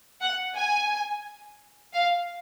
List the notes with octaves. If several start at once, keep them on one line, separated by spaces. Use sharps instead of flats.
F#5
G#5
F5